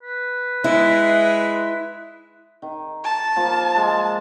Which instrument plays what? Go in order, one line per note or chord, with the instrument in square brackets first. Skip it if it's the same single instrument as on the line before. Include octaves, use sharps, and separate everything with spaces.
[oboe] B4
[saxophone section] G#3 [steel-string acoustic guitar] E4
[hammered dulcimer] D#3
[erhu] A5
[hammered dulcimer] F3 A#3
G#3 G#4